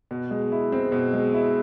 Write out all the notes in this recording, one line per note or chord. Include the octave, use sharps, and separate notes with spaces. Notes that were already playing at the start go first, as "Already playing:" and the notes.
B2
G#3
E4
C4
B2
G#3
E4